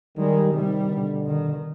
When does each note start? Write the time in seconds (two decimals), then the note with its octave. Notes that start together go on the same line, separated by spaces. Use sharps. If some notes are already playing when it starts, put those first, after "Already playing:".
0.17 D#3 G3 G#3
0.53 C3 D#3 G3
0.90 B2 D3
1.26 D#3